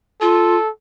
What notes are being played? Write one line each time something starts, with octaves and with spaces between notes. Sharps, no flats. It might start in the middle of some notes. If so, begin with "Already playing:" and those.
F4 A4